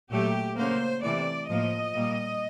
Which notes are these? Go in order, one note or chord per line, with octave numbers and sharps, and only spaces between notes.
A#2 F#3 A3 G4
C#3 F#3 A#3 C5
C3 E3 A3 D5
A2 F3 A#3 D#5
A#2 G3 A#3